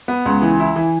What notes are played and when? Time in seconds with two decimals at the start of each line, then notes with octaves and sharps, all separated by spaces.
0.08 B3
0.26 C#2
0.42 E3
0.60 E4
0.76 E3